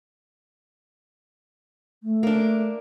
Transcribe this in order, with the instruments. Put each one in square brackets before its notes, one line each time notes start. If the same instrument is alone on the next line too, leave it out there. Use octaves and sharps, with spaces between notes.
[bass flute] A3
[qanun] A#3 D4